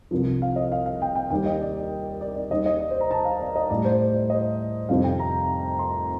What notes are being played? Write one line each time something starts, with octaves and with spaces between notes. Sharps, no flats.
C2 C3 F3
F5
D#5
F5
F5
G5
G5
D#2 D#3 G3 G5
D#5
D5
D5
D5
D#2 D#3 G3 D#5
D#5
D5
C5
A#5
A5
F5
D5
D#5
A2 G3 D5
C5
D5
D5
D#5
F2 C3 D#3 G3 F5
G5
A#5
C6